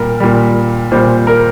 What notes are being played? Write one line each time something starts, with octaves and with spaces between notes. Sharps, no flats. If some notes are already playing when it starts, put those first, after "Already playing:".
Already playing: A#2 G3 A#4
A#2 G3
A#2 G3 C5
A#4